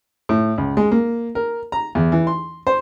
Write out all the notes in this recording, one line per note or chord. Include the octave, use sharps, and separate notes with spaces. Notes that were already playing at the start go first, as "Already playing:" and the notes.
A2
C#2
G#3
A#3
A#4
A#5
E2
E3
C6
C5